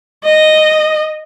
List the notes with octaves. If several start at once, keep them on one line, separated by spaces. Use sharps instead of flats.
D#5